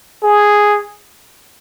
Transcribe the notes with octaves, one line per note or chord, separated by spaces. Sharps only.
G#4